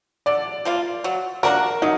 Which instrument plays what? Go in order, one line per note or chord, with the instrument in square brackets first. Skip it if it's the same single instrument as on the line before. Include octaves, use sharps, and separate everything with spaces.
[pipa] D3 [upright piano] D5
[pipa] F3 A#3 F4
F#3
[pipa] A#3 D4 F#4 [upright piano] A#4
[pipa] F#3 [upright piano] D#4